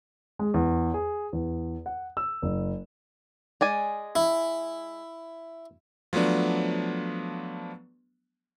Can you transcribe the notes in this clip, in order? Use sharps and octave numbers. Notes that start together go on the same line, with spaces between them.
G#3
E2
G#4
E2
F#5
E6
F#1
G#3 D5 G#5
E4
F3 F#3 A3 B3 D4